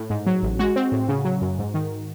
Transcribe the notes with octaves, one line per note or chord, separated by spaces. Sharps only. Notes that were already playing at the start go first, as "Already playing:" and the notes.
Already playing: A2
G#2
F#3
A1
G#3 F#4
C4
A2
C#3
F#3
F#2
G#2
D#3